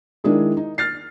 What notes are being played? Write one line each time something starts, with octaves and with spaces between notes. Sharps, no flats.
D#3 G#3 D4 E4 G#4 A#4
D#4
F6 A6 C7